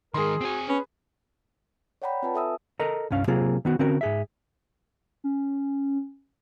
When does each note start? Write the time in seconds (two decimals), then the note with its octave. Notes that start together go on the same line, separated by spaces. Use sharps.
0.14 D#3 G#3 G#4 A#4 C6
0.41 C4 F#4 G#5
0.69 C#4 B4
2.02 C#5 D5 F#5 G5 A#5 B5
2.23 C4 F4 B4 G#5 A5
2.34 A4 E5 D#6 E6
2.79 A4 A#4 D#5 A#5
3.11 C2 G2 C#4 F5
3.28 C3 F#3 A#3 C4 F4 G#4
3.65 D#3 B3 F#4
3.79 D3 C4 C#4 F#4 A#4
4.01 G#2 G#4 E5
5.24 C#4